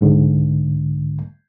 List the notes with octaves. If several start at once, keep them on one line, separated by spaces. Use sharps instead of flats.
C2 G#2 D3